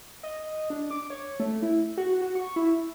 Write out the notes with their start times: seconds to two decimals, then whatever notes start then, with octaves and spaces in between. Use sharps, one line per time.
0.23 D#5
0.70 D4
0.91 D6
1.10 C#5
1.40 A3
1.62 E4
1.97 F#4
2.21 F#4
2.35 C#6
2.56 E4